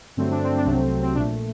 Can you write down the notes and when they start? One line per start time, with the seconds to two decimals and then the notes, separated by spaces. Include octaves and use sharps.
0.17 G2 D3 F#3 A3 C4
0.31 D4
0.44 C4
0.58 D4
0.66 C2 C3 F#3 A3
0.72 C4
1.03 C4
1.15 A#1 A#2 A3 D4